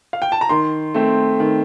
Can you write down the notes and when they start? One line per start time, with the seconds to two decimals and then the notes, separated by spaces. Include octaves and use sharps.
0.13 F5
0.22 G5
0.32 A5
0.41 A#5
0.49 D#3 C6
0.94 A3 C4
1.40 D#3